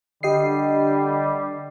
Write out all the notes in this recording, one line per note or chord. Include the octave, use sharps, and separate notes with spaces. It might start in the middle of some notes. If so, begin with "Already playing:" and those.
D3 G3 G4 D#5 C7